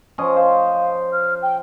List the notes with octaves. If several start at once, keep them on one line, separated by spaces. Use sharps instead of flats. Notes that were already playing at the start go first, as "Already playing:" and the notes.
F3 C#4 D#5
C5 F5
F6
G5